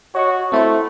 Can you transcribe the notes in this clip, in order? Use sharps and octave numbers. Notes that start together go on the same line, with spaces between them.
F#4 C#5 D#5 C#6
A3 C4 E4 C5